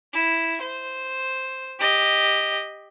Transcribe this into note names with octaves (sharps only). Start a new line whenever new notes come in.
E4
C5
G4 D#5